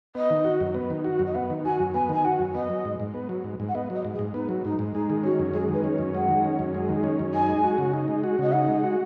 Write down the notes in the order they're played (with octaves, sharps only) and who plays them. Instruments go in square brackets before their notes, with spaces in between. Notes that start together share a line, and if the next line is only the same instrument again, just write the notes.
[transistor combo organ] B3 [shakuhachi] D#5
[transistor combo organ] D#3
F#4
F#2
B3
D#3
F#4
F#2
[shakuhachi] D#5
[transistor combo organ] B3 [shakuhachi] F#5
[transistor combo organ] D#3
[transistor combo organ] F#4 [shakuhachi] G#5
[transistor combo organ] F#2
[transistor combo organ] B3 [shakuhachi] G#5
[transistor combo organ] D#3 [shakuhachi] G#5
[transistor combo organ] F#4 [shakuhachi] F#5
[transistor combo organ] F#2
[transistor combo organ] B3 [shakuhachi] D#5
[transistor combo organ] F#3
G#2
G#2
B3
F#3
G#2
G#2
[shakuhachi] F#5
[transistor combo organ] B3 [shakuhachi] D#5
[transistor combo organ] F#3 [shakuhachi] D#5
[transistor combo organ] G#2
[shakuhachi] G#4
[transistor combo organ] G#2
[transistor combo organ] B3 [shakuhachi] D#4
[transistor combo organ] F#3
[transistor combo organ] G#2 [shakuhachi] D#4
[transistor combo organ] G#2
[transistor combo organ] G#3 [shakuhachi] D#4
[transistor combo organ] D#3
[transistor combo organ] C#4 [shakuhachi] F#4
[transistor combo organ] F#2
[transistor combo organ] G#3 [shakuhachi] G#4
[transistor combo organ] D#3
[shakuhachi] B4
[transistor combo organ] C#4
[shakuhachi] C#5
[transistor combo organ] F#2
[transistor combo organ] G#3 [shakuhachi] F#5
[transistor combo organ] D#3
C#4
F#2
G#3
D#3
C#4
F#2
[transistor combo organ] D#4 [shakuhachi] G#5
[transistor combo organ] G#3
F#4
C#3
D#4
G#3
F#4
[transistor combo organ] C#3 [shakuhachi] D#5
[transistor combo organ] D#4 [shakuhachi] F#5
[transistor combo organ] G#3
F#4